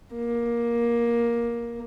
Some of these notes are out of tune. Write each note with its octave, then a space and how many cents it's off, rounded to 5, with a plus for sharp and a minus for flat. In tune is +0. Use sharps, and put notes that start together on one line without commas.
A#3 +15